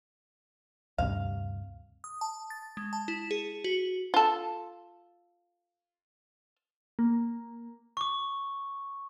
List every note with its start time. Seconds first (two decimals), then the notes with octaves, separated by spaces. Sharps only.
0.98 D2 G2 C3 F5
2.04 D#6
2.21 A5
2.50 A6
2.77 G#3
2.93 A5
3.08 E4
3.31 G#4
3.64 F#4
4.14 F4 A4
6.99 A#3
7.97 C#6 D6